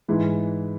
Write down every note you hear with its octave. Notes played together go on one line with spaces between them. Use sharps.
G#2 E3 G#3